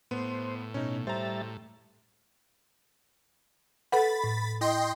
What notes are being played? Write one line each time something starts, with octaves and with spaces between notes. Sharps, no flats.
A2 B3 C5
B2 C#4 D#4
G3 C5 E5 A#5 A6
A4 B4 F#5 B5 A6
A2
E4 D#5 G5 C6